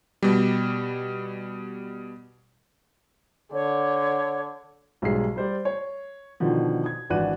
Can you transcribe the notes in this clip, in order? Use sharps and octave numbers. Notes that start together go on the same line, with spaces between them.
B2 G3
D3 C#5
B1 G#2 G3 G#4 C7
G3 C5 D5
C#5
B2 D3 D#3 F3
D#6 G#6
G#1 E3 D4 F#4 F#6 D#7